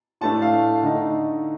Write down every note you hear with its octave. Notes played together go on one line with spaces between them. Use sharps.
A2 A3 D4 A5
F5
D3 A3 D#4